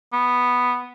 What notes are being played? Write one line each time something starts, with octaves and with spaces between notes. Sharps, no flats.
B3